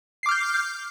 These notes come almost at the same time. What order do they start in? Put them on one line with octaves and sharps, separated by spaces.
C7 D6 F6 G6